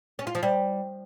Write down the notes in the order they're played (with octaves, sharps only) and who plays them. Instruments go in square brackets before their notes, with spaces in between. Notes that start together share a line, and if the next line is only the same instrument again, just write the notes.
[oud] C#4
F4
F3
G3